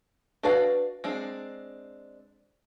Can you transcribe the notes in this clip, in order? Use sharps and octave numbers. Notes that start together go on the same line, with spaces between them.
D4 F#4 B4 D5 F5
G#3 C4 D4